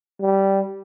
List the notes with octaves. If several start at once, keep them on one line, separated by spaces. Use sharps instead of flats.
G3